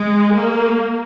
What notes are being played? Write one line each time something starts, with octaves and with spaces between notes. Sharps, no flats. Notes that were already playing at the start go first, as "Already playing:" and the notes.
Already playing: G#3
A#3